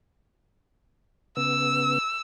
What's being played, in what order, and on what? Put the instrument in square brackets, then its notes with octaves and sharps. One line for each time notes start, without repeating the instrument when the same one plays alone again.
[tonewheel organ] C#3 B3 [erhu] E6